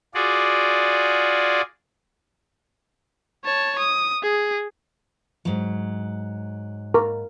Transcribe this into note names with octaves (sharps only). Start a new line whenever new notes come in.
F4 F#4 G#4 D5
C#5 A5
D#6
G#4
G#2 F#3
A#4